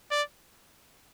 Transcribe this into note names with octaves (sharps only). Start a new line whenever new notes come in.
D5